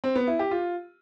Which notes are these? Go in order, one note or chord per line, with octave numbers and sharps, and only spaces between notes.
C4
B3
E4
G4
F4